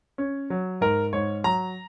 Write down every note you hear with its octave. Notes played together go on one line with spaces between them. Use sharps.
C#4
F#3
G#2 A#4
G#2 C#5
F#3 A#5